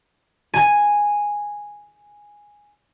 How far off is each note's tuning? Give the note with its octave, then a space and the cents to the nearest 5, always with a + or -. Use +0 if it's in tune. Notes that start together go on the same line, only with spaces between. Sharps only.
G#5 -5